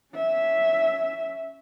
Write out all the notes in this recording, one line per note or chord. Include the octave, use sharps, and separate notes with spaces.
C#4 E5